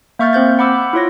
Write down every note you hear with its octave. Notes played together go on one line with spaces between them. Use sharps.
A#3 E5 C#6 F6 G6 A6
C4 C5 G6 A6
F#5 B5 D6 E6
E4 F4 C#5 A#6